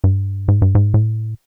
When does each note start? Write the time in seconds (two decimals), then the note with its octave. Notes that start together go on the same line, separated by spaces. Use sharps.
0.04 G2
0.48 G#2
0.62 G2
0.75 G#2
0.94 A2